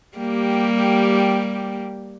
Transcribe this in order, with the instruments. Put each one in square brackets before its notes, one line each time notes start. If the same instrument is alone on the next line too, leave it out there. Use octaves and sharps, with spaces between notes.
[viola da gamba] G3 A#3 G4